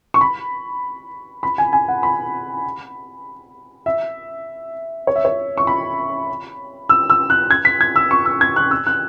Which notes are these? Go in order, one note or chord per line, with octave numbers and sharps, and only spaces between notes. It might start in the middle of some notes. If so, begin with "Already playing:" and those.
C#6
B5
B5
G#5
G#5
F#5
B5
E5
C#5
E5
C#5
C#6
B5
E6
E6
F#6
G#6
B6
G#6
E6
C#6
E6
G#6
F#6
E6
F#6